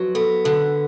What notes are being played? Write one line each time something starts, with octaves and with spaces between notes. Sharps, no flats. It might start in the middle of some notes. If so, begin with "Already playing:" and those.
Already playing: F2 F#3 B4
B3 A4
D3 A4